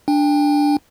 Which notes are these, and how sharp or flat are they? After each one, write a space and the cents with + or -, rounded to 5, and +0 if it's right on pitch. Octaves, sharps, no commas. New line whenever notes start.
D4 +0 G5 +30